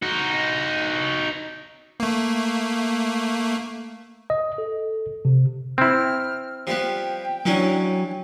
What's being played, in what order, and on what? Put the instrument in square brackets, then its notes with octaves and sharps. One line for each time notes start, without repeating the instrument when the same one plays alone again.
[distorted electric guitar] D#4 F#4
[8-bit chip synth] A3 A#3
[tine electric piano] D#5
A4
C3
[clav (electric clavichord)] C4 E4 [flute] F6
[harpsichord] F3 G3 B3 [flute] G5
[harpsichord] E3 C#4 D4 [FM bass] F#3